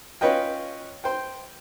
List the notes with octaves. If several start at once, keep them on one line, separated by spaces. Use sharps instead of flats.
C#4 F4 B4 C#5 D#5 G5
C5 G5